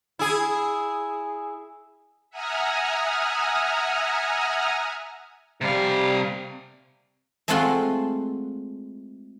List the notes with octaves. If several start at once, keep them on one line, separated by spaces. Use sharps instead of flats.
E4 G#4
E5 F#5 G#5 A#5 D#6 F6
C3 G3 F5
G#3 A3 C4 F4 F#5 C6